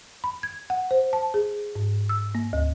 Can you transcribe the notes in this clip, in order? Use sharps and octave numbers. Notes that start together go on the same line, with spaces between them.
B5
G#6
F#5
C5
A5
G#4
G#2
E6
A#3
D2